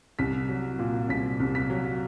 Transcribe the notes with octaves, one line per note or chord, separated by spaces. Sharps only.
C2 B6
F#3
A#2
C2 B6
C2
B6
F#3